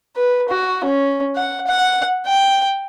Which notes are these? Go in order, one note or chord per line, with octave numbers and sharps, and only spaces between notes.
B4
F#4
C#4
F#5
F#5
G5